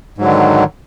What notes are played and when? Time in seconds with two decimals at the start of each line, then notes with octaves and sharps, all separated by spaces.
0.18 G#2
0.21 F#3
0.24 D3
0.27 D#3